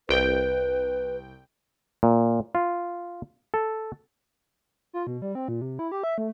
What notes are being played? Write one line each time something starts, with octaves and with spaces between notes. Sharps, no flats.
C2 B4 G5
A#2
F4
A4
F4
B2
G3
C4
A#2
C3
E4
G4
E5
A3